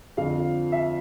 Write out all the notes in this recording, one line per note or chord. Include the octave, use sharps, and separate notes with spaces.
F2 D3 F3 F5
E5